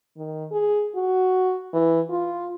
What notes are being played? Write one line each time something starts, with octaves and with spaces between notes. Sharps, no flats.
D#3
G#4
F#4
E3
F4